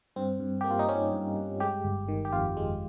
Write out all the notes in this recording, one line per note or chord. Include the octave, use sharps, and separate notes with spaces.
G2 C4
G2
A#3 G4
F4
D#4
G3 C#4
G2
G2
G#3 G4
G1
D#3
G4
F2 F4
G#3